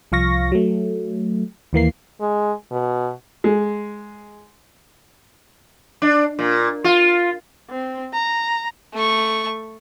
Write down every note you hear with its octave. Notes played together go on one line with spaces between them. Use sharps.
C2 F3 F5 C#6 A#6
F#3 A3
D#2 E3 A#3 C7
G#3
B2
G#3
D4
A#2
F4
C4
A#5
A3 C#6